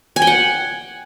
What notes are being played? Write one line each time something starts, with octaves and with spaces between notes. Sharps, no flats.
G#5
G5
F#5